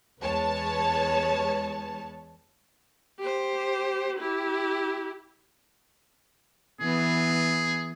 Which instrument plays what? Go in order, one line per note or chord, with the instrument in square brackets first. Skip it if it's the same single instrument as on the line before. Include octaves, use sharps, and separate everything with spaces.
[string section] E2 G#3 B4 C#5 A5
[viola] G4 C5
E4 G4
[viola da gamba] E3 B3 [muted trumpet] G#4